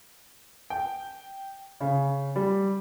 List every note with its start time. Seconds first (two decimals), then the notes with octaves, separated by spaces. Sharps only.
0.70 G5
1.81 C#3
2.36 G3